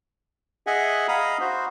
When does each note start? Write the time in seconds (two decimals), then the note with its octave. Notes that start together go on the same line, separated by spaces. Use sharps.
0.67 G#4 D#5 E5 F#5 G#5
1.08 D#5 F5 A#5 B5 D#6
1.41 F#4 C5